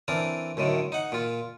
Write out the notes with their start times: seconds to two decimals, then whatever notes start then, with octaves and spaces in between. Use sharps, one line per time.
0.08 E3 C4 D4 A#4
0.57 F#2 A2 D3 D#3
0.92 D#4 F#5
1.12 A#2 F4